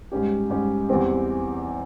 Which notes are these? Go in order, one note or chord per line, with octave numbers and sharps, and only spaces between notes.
G#2 G3 C#4 G4
G#2 G3 C#4 G4
E2 E3 G3 C4 G4